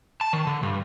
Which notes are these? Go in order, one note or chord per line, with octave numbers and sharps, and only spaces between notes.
A5
D#3
D3
G2